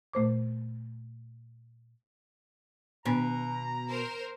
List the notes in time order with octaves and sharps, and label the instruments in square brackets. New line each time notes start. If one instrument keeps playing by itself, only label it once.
[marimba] A#2 A3 C5 D6
[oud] B2 [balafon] D#3 B3 D4 [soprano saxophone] A#5
[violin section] A#4 C5